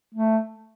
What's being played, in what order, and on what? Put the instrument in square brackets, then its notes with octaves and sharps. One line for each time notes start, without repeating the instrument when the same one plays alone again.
[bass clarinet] A3